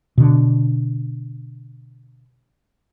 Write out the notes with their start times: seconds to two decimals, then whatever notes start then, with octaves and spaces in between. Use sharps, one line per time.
0.18 B2 D3